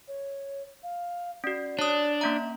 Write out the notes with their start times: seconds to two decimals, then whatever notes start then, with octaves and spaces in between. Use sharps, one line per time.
0.08 C#5
0.83 F5
1.44 C#4 F#4 D5
1.79 D4 C#5 D#6
2.21 A#3 C#4 E5 A#5